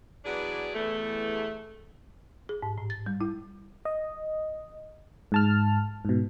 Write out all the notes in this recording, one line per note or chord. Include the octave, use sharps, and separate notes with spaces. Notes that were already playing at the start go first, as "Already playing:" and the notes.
E3 F#3 B3 D4 G#4 D5
E2 A3
G#4
G#2
A2
A6
G3
E4
D#5
G#2 A5 F6
G#2 B2